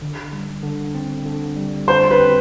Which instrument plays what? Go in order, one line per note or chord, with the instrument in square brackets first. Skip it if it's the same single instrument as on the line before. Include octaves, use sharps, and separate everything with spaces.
[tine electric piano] D3
G3
D3
C4
D3
G3
[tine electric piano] D3 [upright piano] C5
[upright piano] B4
[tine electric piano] C4